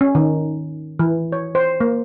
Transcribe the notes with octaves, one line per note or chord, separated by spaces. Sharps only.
C#4
D#3
E3
C#5
C5
A#3